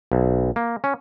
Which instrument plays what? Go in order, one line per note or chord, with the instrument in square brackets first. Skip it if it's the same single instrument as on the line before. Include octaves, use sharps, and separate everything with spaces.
[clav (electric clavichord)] B1
A#3
C#4